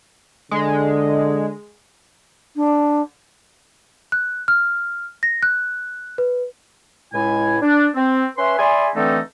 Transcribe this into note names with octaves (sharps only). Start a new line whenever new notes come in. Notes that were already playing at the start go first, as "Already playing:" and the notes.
D3 G#3
D4
F#6
F6
A#6
F#6
B4
C#2 A2 G#3 E4 G#5
D4
C4
C#4 B4 E5 C6
G#4 D5 E5 G#5 B5 C6
D3 E3 A3 C4 D#4 A4